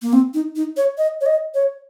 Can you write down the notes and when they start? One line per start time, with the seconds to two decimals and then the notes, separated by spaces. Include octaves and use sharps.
0.02 A#3
0.13 C4
0.34 D#4
0.56 D#4
0.77 C#5
0.98 D#5
1.21 C#5
1.26 D#5
1.54 C#5